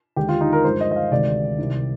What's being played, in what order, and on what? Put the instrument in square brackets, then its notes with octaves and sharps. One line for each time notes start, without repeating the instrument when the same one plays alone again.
[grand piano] D#2 D3 G#3 G4
F4
D#4
A#4
G2 F3 G#3 C5
D#5
D#5
F5
D2 C3 D#3 G#3 D5
C2 C3 D#3